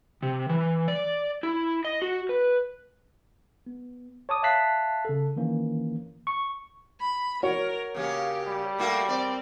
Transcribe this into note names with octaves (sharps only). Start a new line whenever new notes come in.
C3
E3
D5
E4
D#5
F#4
B4
B3
C#5 A5 D6 D#6
E5 F5 A5 F#6 B6 C7
C#3 A4
D#3 E3 A#3 C#4
C#6
B5
F#4 A#4 C#5
C#3 A#3 C#4 G4
G3
A3 A#3 F#4
C4 D5